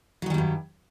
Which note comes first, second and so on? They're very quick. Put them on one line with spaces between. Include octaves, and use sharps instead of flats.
F#3 D#3 G3 E2 G2